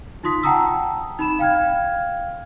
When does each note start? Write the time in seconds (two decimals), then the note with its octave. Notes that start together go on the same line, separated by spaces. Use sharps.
0.23 D#4 F4 C6 D#6 B6
0.43 F#5 G5 A5 A#5 D#6 E6
1.19 D#4 B5 E7
1.39 F5 G5 F6 G#6